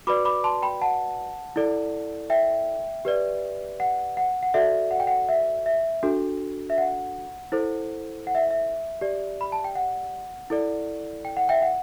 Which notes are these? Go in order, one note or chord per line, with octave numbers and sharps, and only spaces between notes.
F#4 B4 D5 B5 D6
B5 D6
A5 C6
G5 B5
F#5 A5
E4 A4 D5
E5 G5
G4 B4 D5
F#5
F#5
F#5
F#4 A4 D5 E5
F#5
G5
F#5
E5
E5
D4 F#4 A4
E5
F#5
E4 A4 C5
F#5
E5
E5
G4 D5
B5
A5
G5
F#5
E4 A4 D5
G5
F#5
E5 G5
F#5